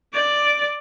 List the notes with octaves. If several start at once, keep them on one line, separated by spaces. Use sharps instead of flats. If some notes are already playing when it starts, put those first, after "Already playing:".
D5 D6